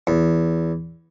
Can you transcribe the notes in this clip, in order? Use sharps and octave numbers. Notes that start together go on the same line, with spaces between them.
E2